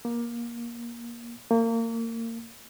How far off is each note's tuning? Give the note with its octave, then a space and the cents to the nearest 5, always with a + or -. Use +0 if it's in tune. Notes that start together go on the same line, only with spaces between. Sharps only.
A#3 +20
A#3 -30